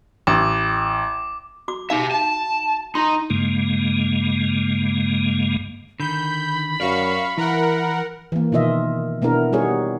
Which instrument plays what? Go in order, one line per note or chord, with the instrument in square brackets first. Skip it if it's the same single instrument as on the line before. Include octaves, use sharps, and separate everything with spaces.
[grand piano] A1 [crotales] D6
[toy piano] F#4 D6
[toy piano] D#4 F5 [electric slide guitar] G4 E5
[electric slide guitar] A5
[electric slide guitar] D#4 [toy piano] C6
[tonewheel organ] G2 C#3 G#3 A#3
[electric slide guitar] D3 D#3 [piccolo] B5 [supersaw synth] G6
[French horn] F#2 [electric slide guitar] F#4 D5 [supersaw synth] F5 C#6
[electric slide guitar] E3 [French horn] E4 [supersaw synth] A#4 F#5
[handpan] E3 A#3
B2 D#3 F4 D#5 E5
B2 A3 B3 D4 E4 A#4
G3 B3 D#4 F#4 G#4 C#5